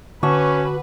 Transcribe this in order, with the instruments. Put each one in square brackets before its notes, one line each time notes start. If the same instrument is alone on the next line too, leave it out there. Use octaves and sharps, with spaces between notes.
[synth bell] D3 [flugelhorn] C#4 [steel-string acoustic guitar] F#4 [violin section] B4